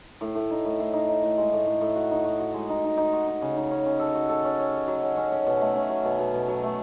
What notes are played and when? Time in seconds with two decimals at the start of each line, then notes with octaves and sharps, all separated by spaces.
0.21 A2
0.35 A2
0.51 D#4
0.65 A2
0.79 A2
0.93 D#4
1.09 D#4
1.23 A2
1.38 G#3
1.52 A2
1.67 A2
1.81 A2
1.95 F#4
2.11 D#4
2.25 F#4
2.40 F#4
2.54 G#3
2.69 D#4
2.84 D#4
2.98 D#4
3.13 F#4
3.28 D#4
3.42 C#3
3.56 D#4
3.71 C#4
3.86 C#4
4.00 A4
4.15 F#4
4.29 A4
4.44 C#4
4.59 C#4
4.73 A4
4.87 F#3
5.02 C#4
5.17 C#4
5.32 C#4
5.47 B2
5.61 A3
5.75 C#4
5.89 F#3
6.05 B2
6.19 B2
6.34 B2
6.48 F#3
6.63 A3